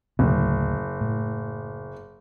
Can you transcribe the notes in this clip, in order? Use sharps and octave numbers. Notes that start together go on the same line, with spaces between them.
F#1 D2 A2 C#3
A2